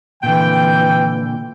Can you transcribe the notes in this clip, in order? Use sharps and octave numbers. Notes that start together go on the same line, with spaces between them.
A#2 D3 E3 G5